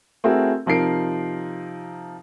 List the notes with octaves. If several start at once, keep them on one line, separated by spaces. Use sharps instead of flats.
A3 C4 E4 F#4 G#4 A#4
C3 F3 D#4 A#4 C7 D7